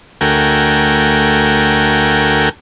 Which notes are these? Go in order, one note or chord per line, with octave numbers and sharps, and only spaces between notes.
D2 A3 F#4 A#4 G5 G#5